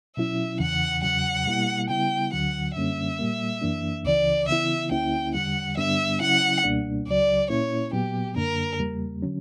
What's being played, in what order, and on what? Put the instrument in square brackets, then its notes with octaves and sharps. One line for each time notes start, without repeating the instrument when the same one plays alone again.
[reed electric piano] B2 F#3 C#4 E4 [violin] E5
[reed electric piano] E2 C#3 E3 [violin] F#5
[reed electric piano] E2 C#3 F#3 [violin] F#5
[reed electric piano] B2 G3 A#3 E4
[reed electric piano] C#3 G3 B3 E4 [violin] G5
[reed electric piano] D2 D3 F#3 [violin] F#5
[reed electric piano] F#2 D3 G3 A#3 C#4 [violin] E5
[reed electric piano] A#2 G3 A#3
F#2 E3 A#3 D4
[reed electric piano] C#2 C#3 E3 [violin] D5
[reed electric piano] C#3 E3 B3 E4 [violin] E5
[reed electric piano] D2 D3 A#3 C#4 E4 [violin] G5
[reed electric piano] E2 D3 G3 [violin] F#5
[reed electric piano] G2 D3 G3 B3 D4 [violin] E5
[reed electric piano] C#3 F#3 C#4 E4 [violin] F#5
[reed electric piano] C#2 B2 G3 A#3 D4
[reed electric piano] C#2 C#3 F#3 [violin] D5
[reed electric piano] A#2 A#3 C#4 E4 [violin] C#5
[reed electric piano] A#2 F#3 B3 [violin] G4
[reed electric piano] F#2 D3 A#3 D4 [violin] A#4
[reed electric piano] E2 C#3 G3 A#3
D3 F#3 C#4